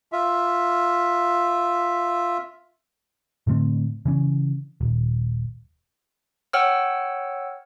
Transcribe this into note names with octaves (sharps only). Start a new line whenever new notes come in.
F4 E5
A2 D3 A3 C4
C#3 E3 C#4
D#1
C#5 F#5 G5 E6 F6